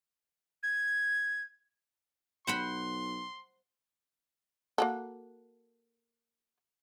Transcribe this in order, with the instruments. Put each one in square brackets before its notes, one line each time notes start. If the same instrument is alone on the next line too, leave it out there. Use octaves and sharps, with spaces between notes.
[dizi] G#6
[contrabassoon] B1 [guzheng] C5 F#5 B5 [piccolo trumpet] C6
[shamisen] A#3 F#4 A4